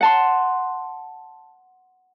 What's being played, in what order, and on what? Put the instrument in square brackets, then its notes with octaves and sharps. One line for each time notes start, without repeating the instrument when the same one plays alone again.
[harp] F#5 A5 C6